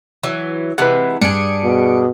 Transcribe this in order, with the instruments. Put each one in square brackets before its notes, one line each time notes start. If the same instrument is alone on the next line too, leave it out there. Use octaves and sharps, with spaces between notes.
[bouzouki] E3 F#3
[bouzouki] C3 E3 G#3 [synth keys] B4 F#5
[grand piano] G2 [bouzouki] D4 G4 G#4 [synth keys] C#7 D7
[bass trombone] B2